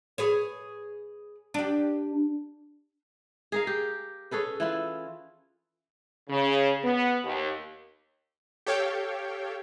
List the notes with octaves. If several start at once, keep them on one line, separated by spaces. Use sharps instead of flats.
G#4 B4 C#5
D4 G4
G#4 A#4 F5
G4
C#4 G#4 A4 B4
E3 E4 F4
C#3
B3
D#2
G4 A4 C#5 F5 G5